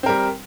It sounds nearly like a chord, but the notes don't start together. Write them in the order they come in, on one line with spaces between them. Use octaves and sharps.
C4 A#4 G3